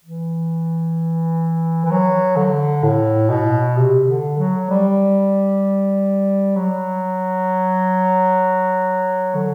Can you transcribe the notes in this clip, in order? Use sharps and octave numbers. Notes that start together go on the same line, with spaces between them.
E3
E3
F#3
D3
A2
B2
C3
D3
F#3
G3
F#3
D3